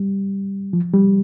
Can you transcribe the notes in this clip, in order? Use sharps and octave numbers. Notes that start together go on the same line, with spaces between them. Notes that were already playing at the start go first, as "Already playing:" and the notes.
Already playing: G3
F3
G3